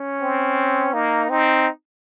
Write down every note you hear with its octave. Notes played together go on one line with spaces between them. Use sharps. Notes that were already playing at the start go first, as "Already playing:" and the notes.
Already playing: C#4
C4
A#3 D#4
C4 D#4